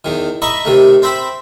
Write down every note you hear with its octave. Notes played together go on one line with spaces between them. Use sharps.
E2 D#3
D#5 E5 A#5 B5 C#6
C3 D#3 A3
C4 C5 E5 G5 B5